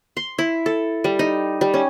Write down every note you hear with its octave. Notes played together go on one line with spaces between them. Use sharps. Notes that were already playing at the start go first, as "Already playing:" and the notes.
C6
E4
A4
G3
D#4
G3
C#4